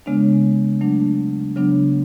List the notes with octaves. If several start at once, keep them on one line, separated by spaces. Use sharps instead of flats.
C#3 G#3 B3 D4
F#3 A3 D4
C#3 F#3 B3 D4